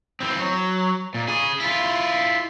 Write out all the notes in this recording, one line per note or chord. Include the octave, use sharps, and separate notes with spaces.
E3 C4
F#3
A#2
C#3 G#4
E4 F4